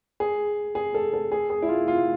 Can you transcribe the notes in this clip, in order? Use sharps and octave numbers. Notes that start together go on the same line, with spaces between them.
G#4
G#4
A4
A4
G#4
G#4
E4
F4
F4